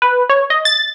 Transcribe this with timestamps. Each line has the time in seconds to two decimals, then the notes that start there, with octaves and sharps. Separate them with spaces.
0.02 B4
0.30 C#5
0.50 D#5
0.65 A6